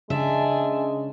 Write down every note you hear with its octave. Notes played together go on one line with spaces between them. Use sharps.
C#3 G#3 D4 E5 G#5